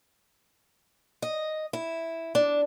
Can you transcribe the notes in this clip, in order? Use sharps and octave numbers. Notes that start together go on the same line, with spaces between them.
D#5
E4
D4